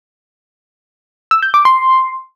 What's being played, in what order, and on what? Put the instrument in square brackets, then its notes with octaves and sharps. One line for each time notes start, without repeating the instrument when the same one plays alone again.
[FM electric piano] E6
G6
D6
C6